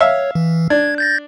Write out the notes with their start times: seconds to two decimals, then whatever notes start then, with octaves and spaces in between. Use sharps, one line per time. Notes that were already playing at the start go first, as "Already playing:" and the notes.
0.01 C#5 E5 F5
0.35 E3
0.70 D4 G#6
0.98 G6 A6 A#6